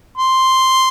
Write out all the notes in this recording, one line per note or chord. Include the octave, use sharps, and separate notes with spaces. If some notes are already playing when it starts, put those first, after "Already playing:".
C6